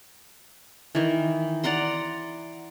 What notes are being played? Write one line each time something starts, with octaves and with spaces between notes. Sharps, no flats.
D#3 E3
D5 F#5 A#5 C6